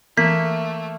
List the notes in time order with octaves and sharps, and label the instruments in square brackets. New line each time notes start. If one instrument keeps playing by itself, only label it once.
[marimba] E3 [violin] A3 [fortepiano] A#3 [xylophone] B6